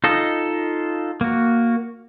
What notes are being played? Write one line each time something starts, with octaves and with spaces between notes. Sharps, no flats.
D#4 F4 A4 D#5
A#3 F#4